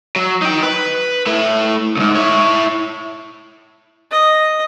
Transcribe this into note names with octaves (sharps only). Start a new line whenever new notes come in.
F#3
D#4 G5
B4
A3 E4
C#2 G#2
E4 C#5
D#5